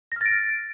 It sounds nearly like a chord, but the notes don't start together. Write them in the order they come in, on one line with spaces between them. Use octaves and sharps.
A#6 F6 A6 D7